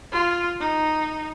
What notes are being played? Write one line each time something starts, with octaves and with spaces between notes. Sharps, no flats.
F4
D#4